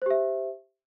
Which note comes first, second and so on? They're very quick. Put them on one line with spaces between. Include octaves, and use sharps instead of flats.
C5 G4 E5